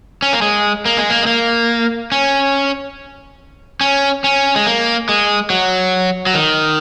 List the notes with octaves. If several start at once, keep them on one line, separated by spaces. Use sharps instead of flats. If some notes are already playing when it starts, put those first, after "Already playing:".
C#4
A#3
G#3
A#3
G#3
A#3
G#3
A#3
C#4
C#4
C#4
G#3
A#3
G#3
F#3
F#3
D#3